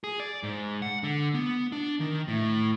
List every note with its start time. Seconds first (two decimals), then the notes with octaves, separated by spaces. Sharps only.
0.04 G#4
0.20 D5
0.43 G#2
0.82 F#5
1.03 D3
1.34 B3
1.72 D4
2.00 D#3
2.28 A2